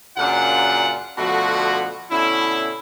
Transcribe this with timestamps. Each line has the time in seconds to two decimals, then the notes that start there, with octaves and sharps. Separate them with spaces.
0.17 F#2 A#2 C#3 D4 F4 F#5
1.18 B2 D3 F3 A3 F#4
2.11 B2 D3 C#4 E4